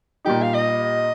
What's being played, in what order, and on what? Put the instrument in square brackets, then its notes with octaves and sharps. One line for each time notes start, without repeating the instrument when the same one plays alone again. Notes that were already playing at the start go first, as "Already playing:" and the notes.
[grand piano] A#2 G3 D#4 [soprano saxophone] G4
[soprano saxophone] F5
D#5